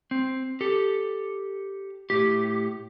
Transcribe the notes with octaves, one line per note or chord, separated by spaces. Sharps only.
C4
G4 A4
A2 G4